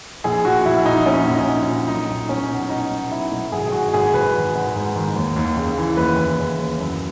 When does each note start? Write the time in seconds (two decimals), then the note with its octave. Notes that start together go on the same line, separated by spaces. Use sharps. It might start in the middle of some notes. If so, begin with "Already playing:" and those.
0.24 A#1 G#4
0.45 A#2 F#4
0.65 A#1 E4
0.86 A#1 D#4
1.06 A#1 C#4
1.27 A#1
1.33 D#4
1.48 A#1
1.68 A#2
1.88 B1 D#4
2.09 B1
2.29 B1 C#4
2.49 B2
2.70 B2 D#4
2.91 B1
3.11 B2 E4
3.31 B1
3.52 G#1 G#4
3.67 G#4
3.72 G#1 F#4
3.94 G#1 G#4
4.13 G#1 B4
4.34 D#3
4.55 G#1
4.75 G#2
4.96 D#3
5.16 D#2
5.36 D#2
5.57 C#3
5.78 E3
5.97 D#2 B4
6.18 D#2
6.39 C#3
6.59 D#2
6.80 F#2